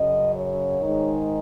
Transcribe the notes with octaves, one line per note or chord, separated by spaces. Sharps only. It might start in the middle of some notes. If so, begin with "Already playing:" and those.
Already playing: F#2 C#3 F#3 D#5
C#5
G#2 D#3 G#3 D#4